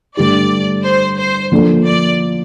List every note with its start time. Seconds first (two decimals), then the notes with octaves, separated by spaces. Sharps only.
0.17 G2 D3 A3 D4 G4 D5
0.84 C5
1.18 C5
1.52 D3 F3 A#3 D4 A4
1.85 D5